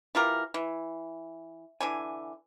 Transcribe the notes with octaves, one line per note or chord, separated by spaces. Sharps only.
E3 F4 G4 A#4
E3
D3 E3 G#5